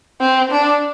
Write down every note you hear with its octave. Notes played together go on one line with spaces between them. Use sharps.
C4
D4